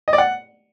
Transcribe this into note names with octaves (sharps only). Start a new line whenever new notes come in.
D#5
D5
F#5